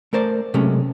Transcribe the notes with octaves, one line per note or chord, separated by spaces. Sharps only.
A3 A#4 C5 D5
C3 F#3 G#3 A3 C#4